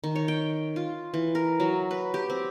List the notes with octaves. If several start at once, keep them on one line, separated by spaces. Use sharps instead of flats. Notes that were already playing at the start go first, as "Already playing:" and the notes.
D#3
C#5
G5
F4
E3
A#4
F#3
B4
G4
C4